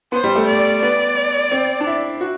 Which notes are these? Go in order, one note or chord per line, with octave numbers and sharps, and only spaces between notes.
B3 C5
G3
A3
D5
B3 D5
C4
D4
E4
F#4